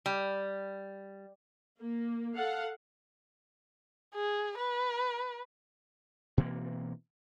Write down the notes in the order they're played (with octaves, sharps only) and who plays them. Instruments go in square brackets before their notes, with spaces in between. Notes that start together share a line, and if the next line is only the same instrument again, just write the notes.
[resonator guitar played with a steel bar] G3
[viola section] A#3
A4 F5 F#5
[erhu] G#4
B4
[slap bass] B2 E3 A#3 C4